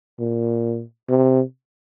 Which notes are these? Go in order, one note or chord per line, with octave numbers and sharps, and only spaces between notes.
A#2
C3